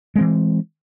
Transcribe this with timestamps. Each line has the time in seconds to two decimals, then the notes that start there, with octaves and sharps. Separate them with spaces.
0.16 G#3
0.18 C4
0.21 E3